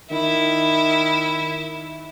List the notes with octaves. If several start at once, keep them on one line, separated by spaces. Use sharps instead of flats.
D#3 E4